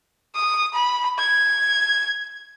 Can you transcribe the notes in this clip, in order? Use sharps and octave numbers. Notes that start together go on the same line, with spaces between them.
D#6
B5
G#6